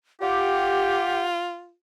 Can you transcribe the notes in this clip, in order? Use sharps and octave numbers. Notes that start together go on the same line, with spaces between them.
F4 G4 F#5